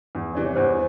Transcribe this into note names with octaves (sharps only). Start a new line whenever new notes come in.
E2
C3 E3 G3 D5
C#5
E2 C5
C#5